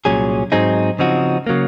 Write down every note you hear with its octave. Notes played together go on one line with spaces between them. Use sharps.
C2 A#2 F#3 C#4 G#4
G#2 F#3 C4 D#4 G#4
C#3 F3 C4 D#4 F#4
C#3 F#3 A#3